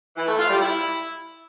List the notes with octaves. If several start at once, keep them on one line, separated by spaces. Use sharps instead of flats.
E3
A3
F4
G3
E4